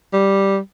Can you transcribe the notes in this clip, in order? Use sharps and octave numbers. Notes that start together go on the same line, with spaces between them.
G3